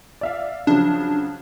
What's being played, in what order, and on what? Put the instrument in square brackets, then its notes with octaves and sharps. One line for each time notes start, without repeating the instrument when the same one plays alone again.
[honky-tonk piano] D5 E5 F5
[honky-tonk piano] C#3 F3 F#3 [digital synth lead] D4